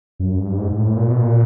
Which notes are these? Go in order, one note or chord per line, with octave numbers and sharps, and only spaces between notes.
F#2
G2
G#2
G#2
A2
A#2
B2
A#2